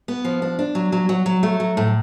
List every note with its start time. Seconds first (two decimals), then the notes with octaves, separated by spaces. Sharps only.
0.08 B3
0.24 F3
0.42 D4
0.59 D4
0.75 F#3
0.92 F#3
1.09 F#3
1.26 F#3
1.43 A3
1.60 F#3
1.77 A2